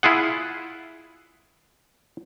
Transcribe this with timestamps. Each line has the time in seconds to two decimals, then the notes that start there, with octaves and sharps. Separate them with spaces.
0.03 E4 F4 G#4 F#5